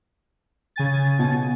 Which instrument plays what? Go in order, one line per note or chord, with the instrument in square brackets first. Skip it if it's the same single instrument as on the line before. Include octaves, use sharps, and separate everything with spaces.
[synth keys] C#3 G#5 A6
[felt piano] B2